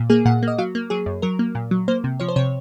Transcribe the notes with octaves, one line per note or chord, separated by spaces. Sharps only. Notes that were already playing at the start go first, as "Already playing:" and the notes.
Already playing: A#2
A#3 G#4
A#2 F#5
A#3
D#5
F#3 F5
A#3
F#3 G#4
F#2
F#3 A#4
A#3
A#2
F#3
A#3 C5
C3
F3 C#5
C5
C3 C#5